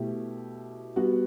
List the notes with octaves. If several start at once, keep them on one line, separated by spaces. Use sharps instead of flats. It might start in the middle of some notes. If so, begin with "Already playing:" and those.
Already playing: B2 A3 E4 G4
G3 B3 F#4